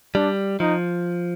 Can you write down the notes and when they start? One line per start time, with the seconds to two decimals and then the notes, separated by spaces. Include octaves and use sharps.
0.15 G3 D4
0.60 F3 D#4